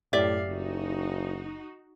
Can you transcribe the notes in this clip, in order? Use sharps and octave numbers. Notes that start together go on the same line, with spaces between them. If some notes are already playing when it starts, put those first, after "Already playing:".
F#2 A2 A3 G4 D5 E5 F5
F#1 D#4 F#4